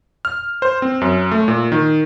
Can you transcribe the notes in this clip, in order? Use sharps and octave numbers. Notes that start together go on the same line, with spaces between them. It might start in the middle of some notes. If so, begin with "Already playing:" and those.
F6
C5
C4
F#2
A3
A#2
D#3